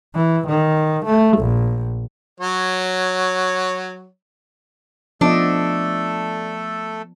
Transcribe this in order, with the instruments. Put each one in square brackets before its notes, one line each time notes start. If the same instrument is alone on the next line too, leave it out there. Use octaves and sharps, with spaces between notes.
[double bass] E3
D#3
A3
A#1
[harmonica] F#3 C#5
[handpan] F3 B3 D#5 [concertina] A3 A4 [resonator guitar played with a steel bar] D4